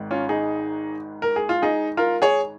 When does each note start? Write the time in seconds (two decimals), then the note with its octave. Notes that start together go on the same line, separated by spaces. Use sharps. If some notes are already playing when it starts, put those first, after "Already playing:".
Already playing: G#1 G#2 D#3
0.11 C#4 F4
0.29 D#4 G#4
1.22 A#4
1.36 G#4
1.49 F4
1.62 D#4 G#4
1.97 F4 A#4
2.22 G#4 C#5